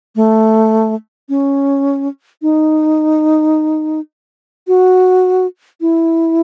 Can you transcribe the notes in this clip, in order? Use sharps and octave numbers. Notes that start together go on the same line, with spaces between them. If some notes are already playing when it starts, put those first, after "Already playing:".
A3
C#4
D#4
F#4
E4